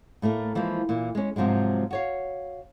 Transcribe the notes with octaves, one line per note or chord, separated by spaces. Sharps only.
A2 A3 A#3 A#4
E3 F3 G#3 A#3
A#2 E3
G#3 C#4
G#2 C3 F3 F#3 G#3
F#4 C#5 F5